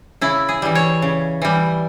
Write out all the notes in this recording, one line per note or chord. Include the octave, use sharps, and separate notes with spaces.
C#3 E4
G#4
E3 G3
C#5
C#3
E3 G3